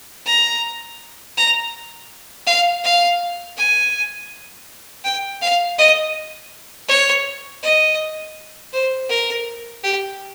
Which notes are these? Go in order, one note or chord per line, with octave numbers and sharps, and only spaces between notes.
A#5
A#5
F5
F5
G#5
G5
F5
D#5
C#5
D#5
C5
A#4
G4